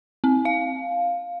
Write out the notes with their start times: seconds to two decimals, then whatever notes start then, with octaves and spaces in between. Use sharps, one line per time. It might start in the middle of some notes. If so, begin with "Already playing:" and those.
0.24 C4
0.45 F5